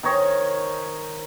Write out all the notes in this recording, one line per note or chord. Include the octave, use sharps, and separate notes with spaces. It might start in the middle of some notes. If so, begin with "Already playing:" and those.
D#3 C5 C#5 D#5